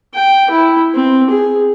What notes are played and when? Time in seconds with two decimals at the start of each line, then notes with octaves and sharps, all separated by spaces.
0.14 G5
0.50 E4
0.95 C4
1.30 G#4